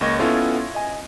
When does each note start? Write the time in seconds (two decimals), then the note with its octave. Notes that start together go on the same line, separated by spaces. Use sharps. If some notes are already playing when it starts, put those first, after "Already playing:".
0.01 C#2 A#3 D#5 C#6 G#6 A#6
0.19 B3 C#4 E4 F4 A4 C#5
0.75 D#5 G#5